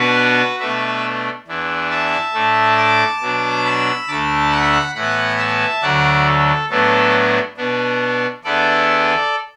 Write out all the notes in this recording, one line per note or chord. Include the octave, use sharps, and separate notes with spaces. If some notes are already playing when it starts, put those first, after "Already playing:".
Already playing: B2 B3 D4 F#4 B4
B2 A3 D4 B4 E5
E2 E3 D4
E5 A5
A2 A3 D4
A5 D6
B2 F#3 D4
B5 E6
D2 D3 A3 A5 D6
F#5 B5
A2 E3 B3 F#5 B5
E5 A5
D2 D3 F#3 D5 F#5
A4
A2 F#3 B3 D4 A4
B2 B3 D4
E2 E3 B3 D4 A4 D5